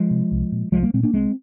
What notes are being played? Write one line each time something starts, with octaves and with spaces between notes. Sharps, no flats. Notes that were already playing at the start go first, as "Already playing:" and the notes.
Already playing: F3 G#3
C3
C2
A#2
C2 F3 G#3
G3 A#3
A#2 G#3 C4
A#3 D4
C2 G#3 C4